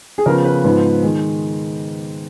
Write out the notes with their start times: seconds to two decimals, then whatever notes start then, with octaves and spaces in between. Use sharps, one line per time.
0.18 G#4
0.26 C#3 F3 B3 A#4
0.45 B4
0.64 G#2 F3 B3
1.03 D#3 G#3